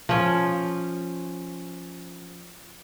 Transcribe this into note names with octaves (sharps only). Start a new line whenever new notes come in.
F3 C#4